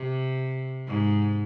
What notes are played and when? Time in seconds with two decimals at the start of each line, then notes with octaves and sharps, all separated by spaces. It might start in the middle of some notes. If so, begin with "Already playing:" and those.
Already playing: C3
0.87 G#2